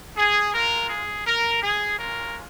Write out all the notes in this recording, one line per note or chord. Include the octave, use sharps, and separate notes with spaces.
G#4
G#3 F4 A#4
G#4
A#4
G#4
G#3 C#4 F4 A#4